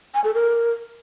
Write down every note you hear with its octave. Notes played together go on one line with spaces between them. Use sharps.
G#5
A4
A#4